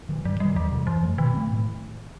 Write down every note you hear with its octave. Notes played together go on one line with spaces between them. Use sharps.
D#3 F#3
G2 F#3
D#3 F#3 G3
E2 F#3
C3 E3 G3
F#2 E3
F#3 A3
B2 D#3
A3 C4
A2